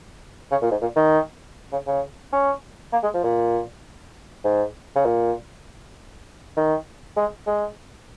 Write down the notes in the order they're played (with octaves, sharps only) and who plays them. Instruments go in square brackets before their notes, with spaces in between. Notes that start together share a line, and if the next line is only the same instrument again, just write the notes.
[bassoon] C#3
A#2
G#2
A#2
D#3
C#3
C#3
C#4
A#3
G#3
F3
A#2
G#2
C#3
A#2
D#3
G#3
G#3